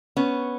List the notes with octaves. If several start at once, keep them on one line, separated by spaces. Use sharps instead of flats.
B3 C#4